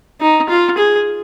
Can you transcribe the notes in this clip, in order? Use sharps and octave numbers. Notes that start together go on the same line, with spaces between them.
D#4
F4
G#4